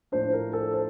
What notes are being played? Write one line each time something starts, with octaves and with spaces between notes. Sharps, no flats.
A2 F3 A3 D4 C5
A#4
A4
C5